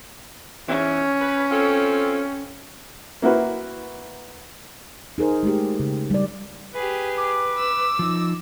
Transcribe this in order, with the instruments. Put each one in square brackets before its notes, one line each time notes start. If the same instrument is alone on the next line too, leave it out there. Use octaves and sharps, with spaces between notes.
[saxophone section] E2 G#2 E3 [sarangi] C#4
[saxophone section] B4
C4 F4 A4
[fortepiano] A#3 E4 F#4 B4
[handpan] D#4 G#4 A#4 C5
G#3 A3 G4
C#3
G3 D5
[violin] G4 G#4 [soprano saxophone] B4
[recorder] D6
[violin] E6
[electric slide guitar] F3 D#4